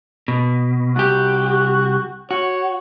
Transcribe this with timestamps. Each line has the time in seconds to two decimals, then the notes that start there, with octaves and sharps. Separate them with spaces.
0.28 B2
0.96 C2 F#4 G4
2.31 F#4 C#5